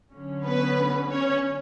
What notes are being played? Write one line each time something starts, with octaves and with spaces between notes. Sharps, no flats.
D3 F#3 C#4
B3 B4
C#4 C#5